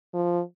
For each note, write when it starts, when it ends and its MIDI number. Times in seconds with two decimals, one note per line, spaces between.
0.14 0.41 53